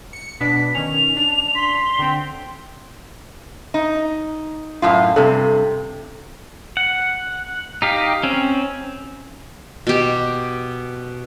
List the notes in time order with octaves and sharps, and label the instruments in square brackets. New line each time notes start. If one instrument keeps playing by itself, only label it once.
[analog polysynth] C#7
[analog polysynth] B2 B3 D4 [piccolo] B6
[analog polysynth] D#3 C#4 [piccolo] F7
[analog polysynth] D4
[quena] C6 [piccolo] B6
[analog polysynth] D3 C4 [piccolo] G5
[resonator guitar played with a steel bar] D#4
F#2 A2 F4
[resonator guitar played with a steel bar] G2 C3 [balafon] A4
[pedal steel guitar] F#5
D#4 G4 F5
C4 C#4
[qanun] B2 G4